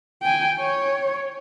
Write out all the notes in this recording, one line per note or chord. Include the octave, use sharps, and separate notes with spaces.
G5 G#5
C#5